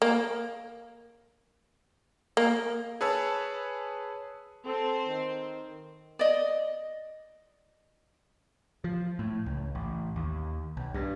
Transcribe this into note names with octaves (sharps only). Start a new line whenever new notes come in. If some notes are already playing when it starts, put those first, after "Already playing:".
A#3
A#3
G#4 B4 C#5 A5 E6
C4 A4 C5
D#3
D5 D#5
F3
A2
C#2
A1
D#2
B1
G2